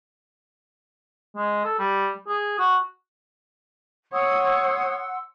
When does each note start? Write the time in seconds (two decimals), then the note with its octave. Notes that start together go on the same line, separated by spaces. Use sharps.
1.37 G#3
1.65 A4
1.79 G3
2.28 G#4
2.59 F#4
4.13 C#5 F#5 C6 D#6 E6